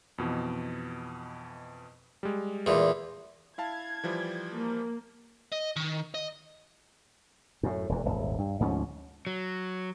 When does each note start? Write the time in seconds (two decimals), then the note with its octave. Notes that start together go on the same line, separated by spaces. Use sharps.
0.18 F2 B2 E3
2.23 G3 G#3
2.66 E2 A#2
3.58 E4 F5 A5 G#6
4.04 E3 F3 G3
4.55 A#3
5.52 D#5
5.76 D#3
6.14 D#5
7.63 F#2 A2
7.89 E1 E2
8.05 D#1 G#1
8.38 G2
8.60 D2 G#2 F3 C#4
9.27 F#3